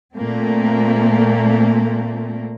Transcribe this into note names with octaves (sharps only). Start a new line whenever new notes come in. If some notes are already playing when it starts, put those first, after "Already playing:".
A#2 A3 A#3 C4